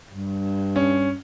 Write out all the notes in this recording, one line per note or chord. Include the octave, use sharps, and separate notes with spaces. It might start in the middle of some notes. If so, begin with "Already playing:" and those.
G2
C#4